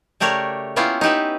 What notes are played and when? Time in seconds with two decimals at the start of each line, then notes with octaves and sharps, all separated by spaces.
0.20 C#3 A3 G4 A#4 C#5 D5
0.76 A#3 B3 C#4 E4 F4 G4
1.01 D#4 E4 G4 B4 E5